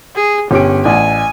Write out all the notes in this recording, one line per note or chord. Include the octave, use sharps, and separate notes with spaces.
G#4
G1 C#4 G4 D7
A1 D5 F#5 G#5